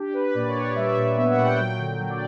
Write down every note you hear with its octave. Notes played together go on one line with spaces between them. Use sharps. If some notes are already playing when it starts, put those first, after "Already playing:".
Already playing: D4 G4
D4 B4
A#2 D5
C#5
D4
D5
G3 E5
A#2
B3 E5
F#5
A#2
G5
F#3 G5
D3
F#3
D5